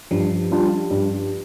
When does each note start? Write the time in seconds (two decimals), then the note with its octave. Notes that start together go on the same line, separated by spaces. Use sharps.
0.11 G2 F3
0.51 G3 D4 F4
0.91 G2